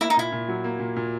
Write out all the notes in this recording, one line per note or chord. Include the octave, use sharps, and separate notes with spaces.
A#3 E4
D#4
A#2 E4
A#2
F#3
A#3
A#2
A#2